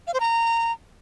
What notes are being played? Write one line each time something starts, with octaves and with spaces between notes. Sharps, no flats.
F5
C5
A#5